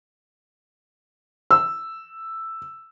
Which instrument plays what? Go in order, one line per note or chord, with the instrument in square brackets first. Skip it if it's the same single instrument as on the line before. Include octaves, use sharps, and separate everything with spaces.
[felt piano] E6